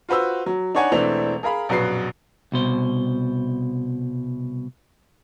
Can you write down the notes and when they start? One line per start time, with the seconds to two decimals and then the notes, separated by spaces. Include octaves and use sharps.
0.09 F4 F#4 B4 C5 E6
0.46 F#3
0.75 D4 D#4 C#5 F#5 G#5
0.92 E1 E3 A3 C4 D4 F7
1.43 G#4 A#4 F5 B5
1.69 A#1 F#2 B2 B4 C7
2.52 C2 B2 C5